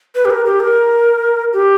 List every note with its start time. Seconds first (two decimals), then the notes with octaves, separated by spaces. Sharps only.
0.15 B4
0.25 G4
0.30 A#4
0.45 G4
0.60 A#4
1.53 G4